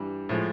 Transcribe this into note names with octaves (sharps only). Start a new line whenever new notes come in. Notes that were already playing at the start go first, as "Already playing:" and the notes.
Already playing: G2 E3 G3
A2 F3 G#3